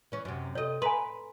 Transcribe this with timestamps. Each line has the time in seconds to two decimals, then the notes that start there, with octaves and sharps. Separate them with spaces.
0.12 E3 C#4
0.25 F#2 C3
0.55 C3 A4 C#5 D#5
0.82 B4 G#5 A#5 C6